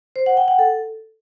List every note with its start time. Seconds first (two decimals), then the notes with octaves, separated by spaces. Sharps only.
0.16 C5
0.26 F#5
0.37 G5
0.48 F#5
0.59 A4